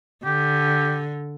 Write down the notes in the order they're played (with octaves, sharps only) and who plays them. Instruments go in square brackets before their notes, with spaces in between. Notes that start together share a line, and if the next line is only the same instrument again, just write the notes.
[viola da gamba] D3 [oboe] G4